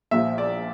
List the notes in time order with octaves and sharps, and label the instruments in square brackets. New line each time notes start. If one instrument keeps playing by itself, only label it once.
[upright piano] A#1 A#2 F3 E5
D5